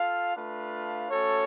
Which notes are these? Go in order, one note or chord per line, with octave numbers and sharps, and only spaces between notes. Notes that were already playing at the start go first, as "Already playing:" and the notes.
Already playing: F4 A4 F5
A3 D4 F4 B4 F5
A3 C#4 F#4 A4 C#5